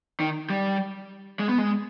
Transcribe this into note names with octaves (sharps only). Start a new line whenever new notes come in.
D#3
G3
G#3
B3
G#3